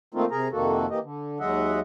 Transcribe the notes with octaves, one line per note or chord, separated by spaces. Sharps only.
D#3 A3 A#3 C4 D#4 F4
C3 G#4 A#4 A#5
F2 C3 D#3 A#3 F#4 A4
E3 A#3 G4 D#5
D3
D#2 F#3 G#3 D#5 E5 F#5